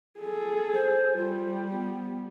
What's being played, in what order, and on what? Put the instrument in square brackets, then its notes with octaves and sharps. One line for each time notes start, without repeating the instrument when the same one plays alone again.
[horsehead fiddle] G#4 A4
[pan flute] C5
[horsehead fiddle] G3 [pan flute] F4
[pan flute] B3